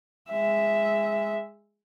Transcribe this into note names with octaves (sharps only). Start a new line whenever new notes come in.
G#3 E5